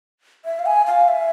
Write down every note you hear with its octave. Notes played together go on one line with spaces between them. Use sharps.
E5
F5
G#5
F5
E5